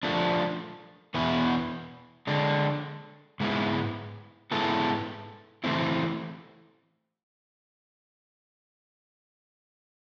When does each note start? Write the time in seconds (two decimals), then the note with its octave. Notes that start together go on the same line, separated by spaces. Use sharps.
0.03 F3 A3 D4
1.14 E2 B2 B3 E4
2.27 D3 G#3 D4
3.40 G#2 G#3 B3 E4
4.51 G#2 G#3 B3 E4 A4
5.64 E3 A3 C4 E4